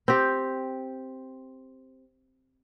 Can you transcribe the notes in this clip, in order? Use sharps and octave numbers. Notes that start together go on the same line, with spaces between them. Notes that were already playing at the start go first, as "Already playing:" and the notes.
C4 G4